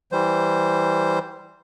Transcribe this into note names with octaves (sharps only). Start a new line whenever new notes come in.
E3 G3 C5